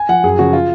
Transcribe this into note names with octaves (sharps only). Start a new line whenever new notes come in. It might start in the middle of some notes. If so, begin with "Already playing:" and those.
Already playing: G#5
F3 F#5
F#2 G#4
C#3 F3 F#4
F4